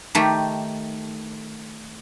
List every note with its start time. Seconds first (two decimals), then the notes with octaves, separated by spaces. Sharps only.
0.15 D#3 A3 G4